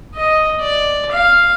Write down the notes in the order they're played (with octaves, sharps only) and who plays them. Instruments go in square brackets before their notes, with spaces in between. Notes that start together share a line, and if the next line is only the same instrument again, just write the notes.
[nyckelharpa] D#5
D5
F5